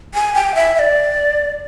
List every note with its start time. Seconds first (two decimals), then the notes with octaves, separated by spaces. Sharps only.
0.15 G#5
0.35 G5
0.55 E5
0.75 E5
0.79 D5